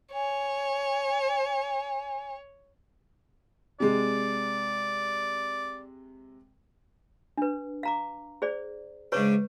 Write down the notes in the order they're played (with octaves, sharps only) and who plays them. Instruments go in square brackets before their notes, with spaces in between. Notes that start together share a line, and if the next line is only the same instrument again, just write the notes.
[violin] C#5 [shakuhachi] G#5
[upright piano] C3 G#3 [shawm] D5
[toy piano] D4 B4
F5 A#5 D6
G#4 C5 D5
[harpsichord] G#2 C#3 D4 [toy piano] B4 C#5 C#6